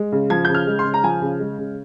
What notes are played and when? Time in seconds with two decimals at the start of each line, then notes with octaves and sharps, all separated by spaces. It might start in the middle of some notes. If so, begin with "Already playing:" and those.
Already playing: G#3
0.12 C#3
0.30 F3 G#6
0.45 C#3 G6
0.55 F6
0.67 G#3
0.79 C6
0.85 C#3
0.94 A#5
1.04 F3 G#5
1.21 C#3
1.40 G#3
1.59 C#3